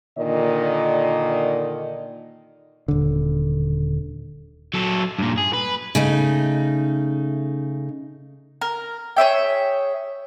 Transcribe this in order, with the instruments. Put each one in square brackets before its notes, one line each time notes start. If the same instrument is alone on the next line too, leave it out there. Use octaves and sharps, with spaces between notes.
[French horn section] A#2 D3 D#3 D5 D#5
[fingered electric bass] D#1 D3
[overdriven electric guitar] F#3 A4
G2 A#2
G#4
B4
[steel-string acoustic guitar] C#3 A3 D#4
[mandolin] A#4
G#4 C#5 E5 G5